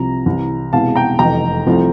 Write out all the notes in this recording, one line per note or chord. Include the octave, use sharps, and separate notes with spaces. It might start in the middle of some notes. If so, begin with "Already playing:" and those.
Already playing: C2 C3 F3 A#5
C2 C3 E3
E1 E2 C3 E3 F5 A5
G5 A#5
F1 F2 E3 G5 A#5
C2 C3 F3 A3